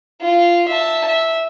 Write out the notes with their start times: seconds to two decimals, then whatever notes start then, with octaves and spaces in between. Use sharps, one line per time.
0.21 F4
0.68 E5 A5
1.08 E5